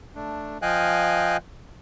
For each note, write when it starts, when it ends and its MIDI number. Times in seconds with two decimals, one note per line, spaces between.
0.15 0.58 57
0.15 0.58 62
0.62 1.37 53
0.62 1.37 75
0.62 1.37 77
0.62 1.37 79
0.62 1.37 80
0.62 1.37 90